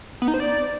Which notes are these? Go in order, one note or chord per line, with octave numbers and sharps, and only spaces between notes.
B3
D#4
C5
D5